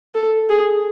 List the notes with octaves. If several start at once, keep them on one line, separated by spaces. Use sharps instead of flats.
A4
G#4